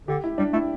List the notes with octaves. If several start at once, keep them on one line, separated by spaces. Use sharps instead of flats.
D3 G4
E4
G3 D4
A3 E4